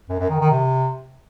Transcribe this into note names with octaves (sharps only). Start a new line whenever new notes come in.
F#2
F#2
D#3
D#3
C3